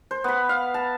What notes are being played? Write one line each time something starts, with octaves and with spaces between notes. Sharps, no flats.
C5
B3 B5
F5
A5